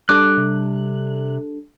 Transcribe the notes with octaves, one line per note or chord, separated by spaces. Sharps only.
G3 D4 A4 D6 F#6
C3